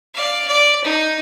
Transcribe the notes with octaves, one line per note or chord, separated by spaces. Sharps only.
D5 F5
D5
D#4